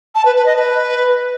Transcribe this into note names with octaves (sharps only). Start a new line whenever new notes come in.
A5
B4
B4
D#5
B4